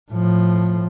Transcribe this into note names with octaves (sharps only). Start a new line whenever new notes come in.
A2 F3